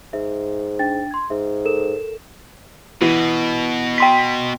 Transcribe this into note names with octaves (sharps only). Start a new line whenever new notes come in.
G#2 E5
D4 G5 A6
C6 G#6
G#2 E5
A4 A#4 E7
B2 E3
G5 C6 B6